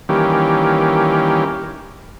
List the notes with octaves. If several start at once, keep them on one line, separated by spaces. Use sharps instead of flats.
D#3 E3 G3 A#3 C#4 G4